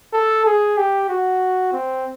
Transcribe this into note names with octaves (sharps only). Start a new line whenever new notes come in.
A4
G#4
G4
F#4
C4